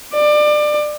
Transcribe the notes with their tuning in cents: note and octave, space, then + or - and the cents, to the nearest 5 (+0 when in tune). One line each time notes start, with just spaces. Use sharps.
D5 +25